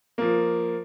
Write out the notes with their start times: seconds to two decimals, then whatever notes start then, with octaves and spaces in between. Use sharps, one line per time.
0.18 F3 A#3